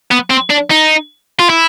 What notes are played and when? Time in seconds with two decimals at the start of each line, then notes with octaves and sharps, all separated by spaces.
0.11 B3
0.30 C4
0.50 D4
0.70 D#4
1.39 F4
1.49 E4